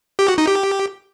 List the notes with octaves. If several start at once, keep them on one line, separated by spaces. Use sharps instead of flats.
G4
F#4
D#4
G4